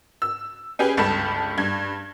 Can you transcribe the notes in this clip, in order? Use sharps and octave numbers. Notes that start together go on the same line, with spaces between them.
E6
C#4 G4 G#4 B4
G1 C#2 A4 A5 B5 E7
G2 G#6